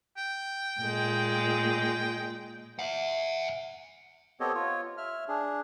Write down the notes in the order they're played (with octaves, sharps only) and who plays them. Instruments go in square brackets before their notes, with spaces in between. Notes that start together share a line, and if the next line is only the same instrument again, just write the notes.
[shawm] G5
[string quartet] A#2 G#3
[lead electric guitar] E5 F#5
[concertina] B3 C4 G4 A4 C#5 D#5
F4 C#5
E5 F6
D4 G#4